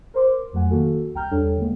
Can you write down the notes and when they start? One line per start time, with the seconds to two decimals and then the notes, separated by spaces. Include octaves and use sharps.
0.14 A#4 C5 C6 D6
0.53 F2 F#3 A3 F#5 G#5
0.70 D#3 A#3 F#4 A4
1.15 C2 G5 A#5 F6 G6
1.31 E2 G3 D4 A4 C#5 G5
1.58 D3 G#3 A#3 B3